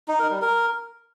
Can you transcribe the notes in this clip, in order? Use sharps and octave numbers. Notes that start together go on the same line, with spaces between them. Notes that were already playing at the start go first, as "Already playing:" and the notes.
D#4
A#4
G3
A#4